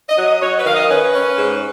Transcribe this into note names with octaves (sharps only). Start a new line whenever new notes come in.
D#5
F#3
D#5
F#3 C#5
B4
D#3 F5
D#5
C#4 B4
C#4
G#2